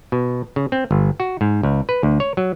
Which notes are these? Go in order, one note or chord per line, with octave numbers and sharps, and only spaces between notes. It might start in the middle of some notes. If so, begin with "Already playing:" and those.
B2
C#3
C4
G1
F#4
G#2
C#2
B4
D2
C#5
F#3